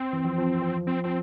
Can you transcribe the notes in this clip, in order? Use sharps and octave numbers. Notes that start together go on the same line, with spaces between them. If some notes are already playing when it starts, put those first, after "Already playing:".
Already playing: C4
E3
F3
F3
F3
F3 C4
F3 C4